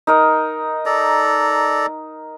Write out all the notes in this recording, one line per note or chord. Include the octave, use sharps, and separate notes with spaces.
D#4 A#4 D#5
A4 D5 A#5